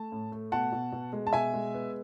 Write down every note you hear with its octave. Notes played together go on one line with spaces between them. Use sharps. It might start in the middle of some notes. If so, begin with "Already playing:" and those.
Already playing: A3 A5
A2
A3
B2 F#5 A5
B2
B2
G#3
A5
B2 E5 G#5
G#3
B3